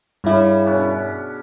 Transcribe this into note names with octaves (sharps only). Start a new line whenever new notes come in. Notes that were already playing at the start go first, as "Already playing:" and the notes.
G2 C#3 G3 E4
B2 C#4 D4